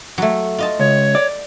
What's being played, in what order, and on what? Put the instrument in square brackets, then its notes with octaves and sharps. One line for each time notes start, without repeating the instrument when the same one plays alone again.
[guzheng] F#3 A3
F4 D#5 A5
[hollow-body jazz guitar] C#2 [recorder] C#5
[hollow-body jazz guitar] D5